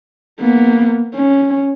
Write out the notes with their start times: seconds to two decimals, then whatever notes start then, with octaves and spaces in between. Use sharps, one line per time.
0.41 A#3 B3
1.15 C#4